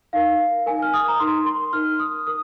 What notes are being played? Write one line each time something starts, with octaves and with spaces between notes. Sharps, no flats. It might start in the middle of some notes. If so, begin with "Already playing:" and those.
D#4 A#4 F5
D#4 A#4 G#5
F6
D#6
A#5
D#4 A#4 C6
C6
D#4 A#4 F6
D#6
A#4 D#6